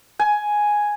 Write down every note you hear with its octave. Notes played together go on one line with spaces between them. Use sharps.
G#5